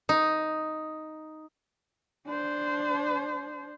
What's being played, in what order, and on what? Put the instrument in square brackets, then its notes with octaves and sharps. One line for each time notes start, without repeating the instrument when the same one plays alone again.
[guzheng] D#4
[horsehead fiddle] D4 C5